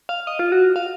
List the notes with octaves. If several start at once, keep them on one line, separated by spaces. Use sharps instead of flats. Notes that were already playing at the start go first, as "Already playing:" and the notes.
F5
D#5
F4
F#4
F5